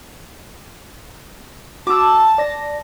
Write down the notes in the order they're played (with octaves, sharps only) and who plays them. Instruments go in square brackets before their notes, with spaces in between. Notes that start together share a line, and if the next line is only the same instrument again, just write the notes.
[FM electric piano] F#4 E6 [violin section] A5 [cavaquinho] D6
[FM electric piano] D5 A#6